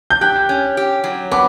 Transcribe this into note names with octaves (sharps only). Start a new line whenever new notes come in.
G6
G4 F#6
C#4
G4
F#3
B3 D6